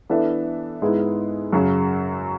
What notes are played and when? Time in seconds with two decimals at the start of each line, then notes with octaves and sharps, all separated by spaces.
0.10 E3 B3 D4 A4 E5
0.82 G#2 G#3 B3 E4
1.53 F#2 C#3 F#3